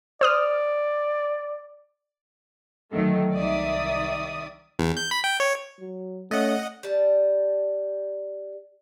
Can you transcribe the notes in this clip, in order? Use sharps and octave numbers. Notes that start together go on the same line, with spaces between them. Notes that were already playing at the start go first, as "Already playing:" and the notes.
C5 D5 D#6 F6
D2 D#3 F#3 A3
C2 D#3 D5 E5 D#6
E2
G6
B5
G5
C#5
F#3
A3 C#4 D#5 F#5
G3 A5